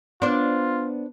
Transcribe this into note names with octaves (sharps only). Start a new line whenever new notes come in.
B3 D4 F4 C5